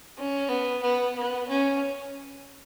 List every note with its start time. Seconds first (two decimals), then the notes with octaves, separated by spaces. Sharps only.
0.17 C#4
0.49 B3
0.82 B3
1.15 B3
1.48 C#4